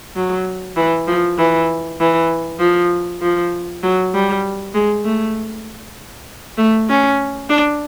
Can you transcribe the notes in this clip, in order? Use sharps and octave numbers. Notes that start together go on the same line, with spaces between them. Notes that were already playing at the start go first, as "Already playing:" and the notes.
F#3
E3
F3
E3
E3
F3
F3
F#3
G3
G#3
A3
A3
C#4
D4